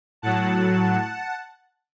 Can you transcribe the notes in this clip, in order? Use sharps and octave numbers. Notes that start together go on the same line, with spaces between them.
A2 F#3 F#5 A5